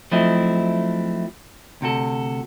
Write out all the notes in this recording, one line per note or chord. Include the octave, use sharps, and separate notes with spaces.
F3 F#3 A3 C4 E4 D#5
D2 C3 F#4 A4